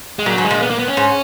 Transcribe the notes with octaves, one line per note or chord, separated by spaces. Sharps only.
G#3
A#2 F#3
G#2
G#3
A#2
B3
A#3
B3
C#4
G#2